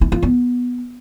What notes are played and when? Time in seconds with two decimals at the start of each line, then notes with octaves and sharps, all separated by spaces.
0.01 E4
0.12 F4
0.22 B3